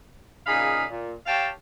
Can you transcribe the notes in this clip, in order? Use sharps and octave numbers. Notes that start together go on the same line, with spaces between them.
A#2 C#3 D#4 G#4 F5 B5
A#2
G4 C#5 F5 G5 A5